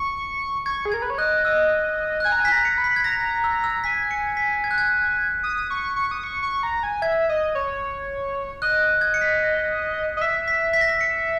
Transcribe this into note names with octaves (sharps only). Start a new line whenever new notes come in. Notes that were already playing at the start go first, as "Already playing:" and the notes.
Already playing: C#6
C#6 G#6
G#4
A#4 G#6
B4
C#5
D#5 F#6
D#5 E6
F#6
G#5 G#6
A#5
G#5
B6
A#5
C#7
B5
B6
G#6
A#5 A#6
E6
E6
G#5 B6
C#7
B6
G#6
F#6
G#6
D#6
C#6
C#6
D#6
C#6
C#6
A#5
G#5
E5 G#6
D#5
C#5
D#5 F#6
G#6
C#7
B6
D#5
E5 B6
B6
B6
A#6
B6
C#7